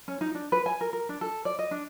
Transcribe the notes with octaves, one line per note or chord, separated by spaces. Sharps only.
C#4
D#4
D4
B4
G#5
A#4
A#4
D4
A4
D5
D#5
D4